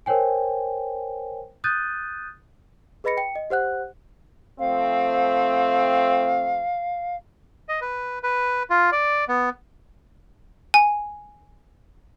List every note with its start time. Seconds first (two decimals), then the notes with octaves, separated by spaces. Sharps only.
0.06 A#4 C5 C#5 G5 G#5
1.64 D#6 F#6 G6 A6 D#7
3.04 G#4 B4 D#5 B5 A#6 C#7
3.17 G5 C#7
3.35 D#5
3.50 G4 C5 F#5 F#6
4.59 F3 A3 C4 F5
7.69 D#5
7.81 B4
8.23 B4
8.70 F4
8.92 D5
9.28 B3
10.74 G#5